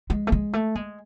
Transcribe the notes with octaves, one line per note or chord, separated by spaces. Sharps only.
G#3
A3
G#3
A3
G#3